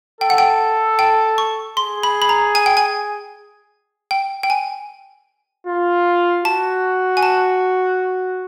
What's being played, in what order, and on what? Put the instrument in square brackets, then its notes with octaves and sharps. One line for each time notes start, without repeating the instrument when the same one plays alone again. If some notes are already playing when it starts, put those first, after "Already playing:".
[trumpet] A4 [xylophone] G5
[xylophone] F#5
G5
G5
C#6
[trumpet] G#4 [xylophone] C6
[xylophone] B5
B5
A#5
G#5
G5
G#5
G5
G5
G#5
[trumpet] F4
[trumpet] F#4 [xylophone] A5
[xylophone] G#5
A5